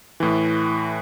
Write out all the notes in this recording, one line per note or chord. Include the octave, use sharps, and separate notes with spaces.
A2 E3